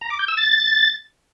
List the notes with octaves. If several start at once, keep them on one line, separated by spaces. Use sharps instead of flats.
A#5
D6
G6
E6
A6